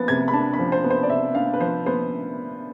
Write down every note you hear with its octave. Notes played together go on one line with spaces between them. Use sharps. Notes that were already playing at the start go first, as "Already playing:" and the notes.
Already playing: F3 B3 A6
C3 G#6
B5
D4 A5
B5
F3
C5
B3
C5
D5
C3 E5
D4 F5
B4
F3 C5
B3 C5